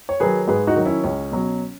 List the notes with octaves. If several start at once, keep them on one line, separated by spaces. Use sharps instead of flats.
C#5
D#3 F#3 G#4 B4
G#2 G#4 B4
D#4 F#4
D#3 F#3
C#4 E4
C#2 C#4
B2 F#3